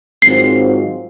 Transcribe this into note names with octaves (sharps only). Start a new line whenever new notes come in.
G#2 D#3 F#3 C4 F4 C7